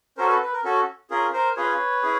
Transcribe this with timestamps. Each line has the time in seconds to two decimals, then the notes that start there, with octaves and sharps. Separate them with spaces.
0.17 C#4 F#4 A4 A#4 C5
0.29 A4 B4
0.43 B4
0.53 A#4
0.64 C#4 F#4 A4
1.10 C#4 F4 G#4 A#4
1.33 A#4 C5
1.57 C#4 F4 G#4 B4 C#5
2.03 C#4 E4 G#4